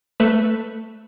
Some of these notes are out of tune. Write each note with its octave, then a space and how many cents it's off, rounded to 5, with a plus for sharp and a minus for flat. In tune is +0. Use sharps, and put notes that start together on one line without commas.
A3 +15 B4 +0 E5 +0